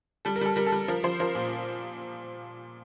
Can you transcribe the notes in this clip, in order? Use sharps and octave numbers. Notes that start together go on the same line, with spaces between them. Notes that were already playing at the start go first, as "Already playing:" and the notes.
G3 A4
A#4
G3 A4
G3 A#4
A4
G3
F3 A#4
F3 C5
F3 A#4
A#2